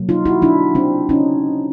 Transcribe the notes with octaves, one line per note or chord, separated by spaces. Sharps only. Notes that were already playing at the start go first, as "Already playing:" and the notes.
Already playing: B2 F#3 A#3
D#4 F4
E4 F#4
D4 E4
C4 D4
C#4 D#4